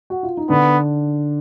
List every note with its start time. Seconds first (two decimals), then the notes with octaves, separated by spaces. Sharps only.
0.10 F#4
0.23 F4
0.37 D#4
0.49 D3 B3 D4